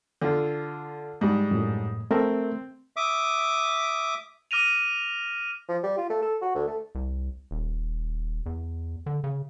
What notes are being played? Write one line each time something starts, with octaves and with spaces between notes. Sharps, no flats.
D3 F4
G#2 G3
F#2 A2
A3 C4 A#4 E5
E5 D6 D#6
D6 F6 A#6 D#7 F7
F3
G3
F4
A3
A4
F#4
D2
A3
C2
D#1
E2
D3
C#3